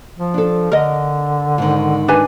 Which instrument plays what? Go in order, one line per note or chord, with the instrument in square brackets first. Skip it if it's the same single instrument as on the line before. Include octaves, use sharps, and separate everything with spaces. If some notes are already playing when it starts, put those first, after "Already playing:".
[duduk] F3
[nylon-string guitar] D4 A4
[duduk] D3 [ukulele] A#4 D#5
[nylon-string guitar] G#2 D#3
[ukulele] D4 B4 G#5